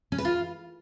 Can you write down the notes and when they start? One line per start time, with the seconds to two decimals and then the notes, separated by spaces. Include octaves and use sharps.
0.12 C#4
0.18 B4
0.25 F4